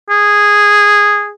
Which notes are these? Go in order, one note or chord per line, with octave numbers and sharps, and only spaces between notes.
G#4